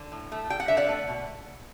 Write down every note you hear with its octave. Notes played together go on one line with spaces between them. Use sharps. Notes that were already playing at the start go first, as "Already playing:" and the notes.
Already playing: D3
A2
A3
G3 G5
F#5
D3 E5
D5 F#5
A3
B2